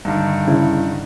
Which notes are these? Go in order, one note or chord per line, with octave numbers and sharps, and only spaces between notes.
G2 D3 D#3
C#3 E4